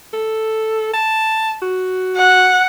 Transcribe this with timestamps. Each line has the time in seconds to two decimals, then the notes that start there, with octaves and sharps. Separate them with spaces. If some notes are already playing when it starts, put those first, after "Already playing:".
0.13 A4
0.94 A5
1.62 F#4
2.16 F#5